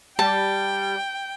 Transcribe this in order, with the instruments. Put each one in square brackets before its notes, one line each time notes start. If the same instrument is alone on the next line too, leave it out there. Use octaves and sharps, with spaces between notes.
[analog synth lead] G3 [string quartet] G5 [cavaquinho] A5